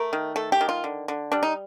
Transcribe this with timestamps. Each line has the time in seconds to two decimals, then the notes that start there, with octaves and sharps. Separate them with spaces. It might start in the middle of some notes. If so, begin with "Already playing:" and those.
Already playing: A3 A#4
0.13 D#3
0.36 A3 A4
0.52 G4
0.61 D#3
0.69 F4
0.84 D3
1.08 D3
1.32 G3 D4
1.43 D#4